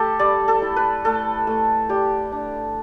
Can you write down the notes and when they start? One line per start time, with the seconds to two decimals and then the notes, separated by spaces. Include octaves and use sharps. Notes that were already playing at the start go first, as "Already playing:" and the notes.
Already playing: A3 G4 A4
0.19 G3 D5
0.48 A4
0.62 E4
0.76 B4
1.05 A3 A4
1.47 A3
1.89 G3 G4
2.32 D4